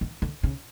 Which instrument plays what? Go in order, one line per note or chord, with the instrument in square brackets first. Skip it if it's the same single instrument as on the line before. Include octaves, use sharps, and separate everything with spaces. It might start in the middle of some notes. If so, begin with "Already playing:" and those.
[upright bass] D#3
D3
C#3